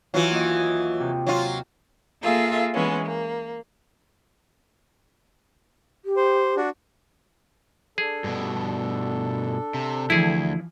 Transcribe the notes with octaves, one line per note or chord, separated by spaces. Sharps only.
E3 F#3 F4 F#4 F5
D#2 D#5
C3
F#3 F4
A#3 F4 G#4 A4 E5 F5
E3 G#3 B3 C#4
A#3
G4
C5
D4 F#4
D4 G#4 A4
G2 B2
C3
D2 E3 F3 E4 G#4